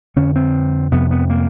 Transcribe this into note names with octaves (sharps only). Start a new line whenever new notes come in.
F2 D3 C#4
C4
F2 C3 B3
B3
A#3